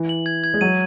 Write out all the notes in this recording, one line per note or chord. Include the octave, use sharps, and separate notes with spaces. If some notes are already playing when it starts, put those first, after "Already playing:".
Already playing: E3
F#7
G#6
G#6
G#3
F#3 D#7